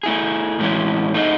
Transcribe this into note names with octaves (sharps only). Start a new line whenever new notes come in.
A3 E4 G#4
A2 E3 G#3 C#4 E4
A3 D#4 G#4 D#5